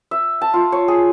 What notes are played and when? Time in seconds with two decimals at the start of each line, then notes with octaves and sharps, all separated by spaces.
0.11 E5
0.41 A5
0.53 F4
0.72 C#5
0.88 G#4